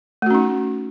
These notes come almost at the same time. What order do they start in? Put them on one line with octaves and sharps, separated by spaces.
A3 F#4 C#4 D#4